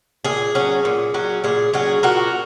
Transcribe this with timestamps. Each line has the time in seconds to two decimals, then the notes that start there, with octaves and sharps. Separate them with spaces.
0.25 A#2 G#4
0.55 F#3 C#4
0.85 A#2
1.14 F#3 C#4
1.44 A#2 G#4
1.74 F#3 C#4 G#4
2.03 A#2 F#4 A#4